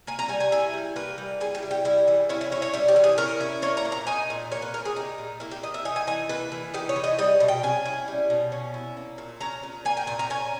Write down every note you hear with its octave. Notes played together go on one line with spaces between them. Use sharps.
A#3 G#5
A#5
G3 G#5
G#5
E4 G#5
G3
A#3 B4
G3
E4 G#4
G4
G3
G4
G3 E4
E3
C#4 E4
E4
E4 C#5
C#5
G3 E4
G4
E3
G#4
C#4 A#4
E4
A#3 C#5
A#5
A#2
A#5
D#4 G#5
A#2
A#3 C#5
B4
A#2 A#4
G#4
D#4 G4
A#2
A#3 E4
G4
E3 D#5
E5
D#4 G#5
G#5
E3 G#5
A#3 B4
E3
D#4 G4
C#5
E3
D#5
G3 D#5
B2
G5
C#4 G#5
E4
G3
B2
C#4
E4
A#3
A#2
C#4 A#5
A#2
A#3 G#5
G5
A#2 G#5
A#5
C#4 G#5